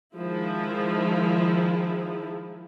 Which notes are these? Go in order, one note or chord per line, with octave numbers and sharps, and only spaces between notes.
D#3 F3 G#3 E4